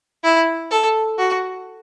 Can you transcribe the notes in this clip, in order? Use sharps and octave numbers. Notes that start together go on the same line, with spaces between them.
E4
A4
F#4